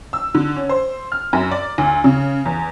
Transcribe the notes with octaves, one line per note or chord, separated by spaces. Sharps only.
E6
D3
C#4
C5
F6
F#2
D5
D2
C#3
E2